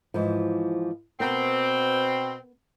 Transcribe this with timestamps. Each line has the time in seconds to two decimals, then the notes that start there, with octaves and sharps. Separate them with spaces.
0.14 G#2 E3 F3
1.20 B2 B3 C4 A#4